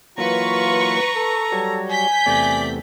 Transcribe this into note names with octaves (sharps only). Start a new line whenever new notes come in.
E3 F#3 A#3 F4 B4 A#5 C#6
A4
F#3 G3 C#5
G#5 G6 B6
E2 C3 A3 D5